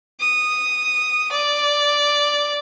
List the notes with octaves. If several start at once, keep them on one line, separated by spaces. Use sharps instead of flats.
D#6
D5